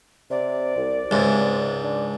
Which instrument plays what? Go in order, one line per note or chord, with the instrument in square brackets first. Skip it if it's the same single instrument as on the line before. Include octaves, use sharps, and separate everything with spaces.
[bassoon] C3 [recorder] D5
[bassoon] C2
[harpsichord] C#2 G#2 [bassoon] C3
[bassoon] D4